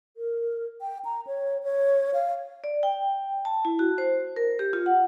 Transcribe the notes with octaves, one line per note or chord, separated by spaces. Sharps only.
A#4
G5
A#5
C#5
C#5
F5
D5
G5
A5
E4
F#4
C5
A#4
G4
F4
F#5